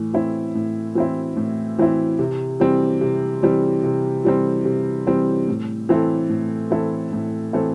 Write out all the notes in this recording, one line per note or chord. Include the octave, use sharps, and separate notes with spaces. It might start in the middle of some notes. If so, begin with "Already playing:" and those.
Already playing: A2 E3
E3 C4 E4
A2
E3 C4 E4
A2
E3 C4 E4
C3
E3 G3 C4
C3
E3 G3 C4
C3
E3 G3 C4
C3
E3 G3 C4
A2
E3 C4 E4 A4
A2
E3 C4 E4 A4
A2
E3 C4 E4 A4